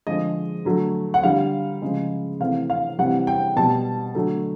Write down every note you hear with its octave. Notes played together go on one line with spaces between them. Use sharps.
D3 F3 G#3 D#5
D3 F#3 A3
F#5
D3 G3 F5
C#3 F3 G#3
C3 E3 A3 F5
F5
C3 E3 G3 F#5
G5
B2 G3 A5
D3 F#3 A3